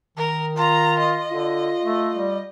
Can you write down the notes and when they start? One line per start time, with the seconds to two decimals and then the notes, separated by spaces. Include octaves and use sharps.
0.17 D#3 A#4
0.56 F4 A#5
0.99 D#5
1.31 D3 F4
1.84 A3
2.15 G3